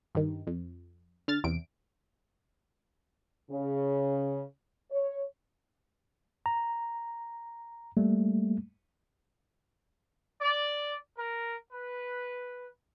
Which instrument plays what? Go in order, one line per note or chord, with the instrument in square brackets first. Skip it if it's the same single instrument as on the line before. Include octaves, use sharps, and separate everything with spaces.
[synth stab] G2 D#3
F2
D3 F6 A6
E2 C3 D7
[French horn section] C#3
C#5
[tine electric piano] A#5
G3 A3 A#3
[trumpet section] D5
A#4
B4